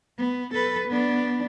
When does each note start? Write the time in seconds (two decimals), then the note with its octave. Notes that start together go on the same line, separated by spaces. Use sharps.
0.18 B3
0.54 A4 B4
0.88 B3 D4